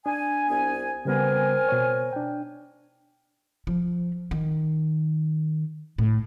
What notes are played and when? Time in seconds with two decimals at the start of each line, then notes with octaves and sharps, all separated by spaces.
0.06 D4 G#5
0.47 C2 B3 G#5
1.05 C#3 G3 B3 C4 A#4 G#5
1.69 B2 C#5
2.13 D4 G5
3.67 F3
4.31 D#3
5.98 A2